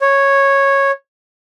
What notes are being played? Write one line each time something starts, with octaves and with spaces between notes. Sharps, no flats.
C#5